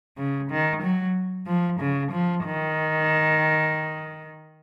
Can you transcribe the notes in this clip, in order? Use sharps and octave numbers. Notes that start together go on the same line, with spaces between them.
C#3
D#3
F#3
F3
C#3
F3
D#3